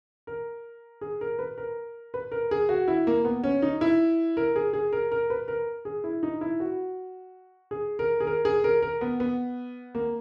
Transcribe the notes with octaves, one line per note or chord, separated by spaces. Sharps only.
A#4
G#4
A#4
B4
A#4
B4
A#4
G#4
F#4
E4
A#3
B3
C#4
D#4
E4
A#4
G#4
G#4
A#4
A#4
B4
A#4
G#4
E4
D#4
E4
F#4
G#4
A#4
G#4
A#4
G#4
A#4
A#4
B3
B3
A#3